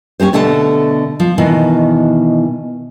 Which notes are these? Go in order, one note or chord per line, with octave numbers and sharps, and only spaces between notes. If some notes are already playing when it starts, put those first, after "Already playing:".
C#4 D#4 G4 C5
B2 D3 A3 F#5 A5
F3
B2 D#3 E3